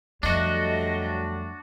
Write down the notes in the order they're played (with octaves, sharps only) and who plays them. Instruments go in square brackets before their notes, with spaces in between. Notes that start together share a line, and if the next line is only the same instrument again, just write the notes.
[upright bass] F2 [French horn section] F#3 G3 A3 [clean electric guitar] D4 F#4 [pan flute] D#5